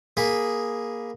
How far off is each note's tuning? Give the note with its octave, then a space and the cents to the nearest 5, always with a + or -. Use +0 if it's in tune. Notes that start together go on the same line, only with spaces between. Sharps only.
A#3 +10 G#4 +0 B5 +0